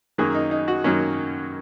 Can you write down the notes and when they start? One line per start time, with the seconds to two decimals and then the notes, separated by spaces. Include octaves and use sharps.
0.18 F#2 D#3 F#3 A#3 G#4
0.35 D#4
0.51 D#4
0.68 F#4
0.84 F#2 D#3 F#3 A#3 C#4